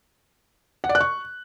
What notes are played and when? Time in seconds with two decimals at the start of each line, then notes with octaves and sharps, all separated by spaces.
0.84 F#5
0.89 D5
0.95 F#6
1.01 C#6